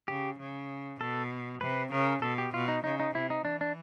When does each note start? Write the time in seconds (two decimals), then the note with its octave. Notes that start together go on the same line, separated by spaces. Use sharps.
0.08 C#3 G4
0.39 C#3
1.00 B2 A4
1.61 C3 B4
1.92 C#3 A#4
2.22 B2 A4
2.38 G4
2.54 B2 F4
2.68 D#4
2.84 C#3 D#4
3.00 D#4
3.14 C3 E4
3.30 D#4
3.45 E3 D4
3.61 D4